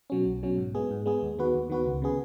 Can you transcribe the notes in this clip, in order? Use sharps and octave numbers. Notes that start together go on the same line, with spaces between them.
B2 F#3 C#4
B1
B2 F#3 C#4
G#2
G#3 B3 G#4
G#2
G#3 B3 G#4
D#2
D#3 B3 F#4 B4
D#2
D#3 B3 F#4 B4
C#2
C#3 B3 G#4